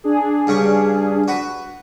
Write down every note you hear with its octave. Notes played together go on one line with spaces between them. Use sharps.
D4 G#4
G2 C#3 C#6
F#4 B4